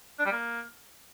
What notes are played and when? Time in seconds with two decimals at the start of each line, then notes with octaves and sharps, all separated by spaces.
0.19 D4
0.25 G3
0.32 A#3